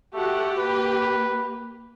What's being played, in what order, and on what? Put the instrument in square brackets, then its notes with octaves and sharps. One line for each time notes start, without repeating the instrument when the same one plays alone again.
[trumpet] A3 [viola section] F#4 A4 F#5 [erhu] G4
[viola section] A#3 [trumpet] B4